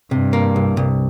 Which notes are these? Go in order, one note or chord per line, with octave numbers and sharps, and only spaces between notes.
G2 C3
A#3
C2
C2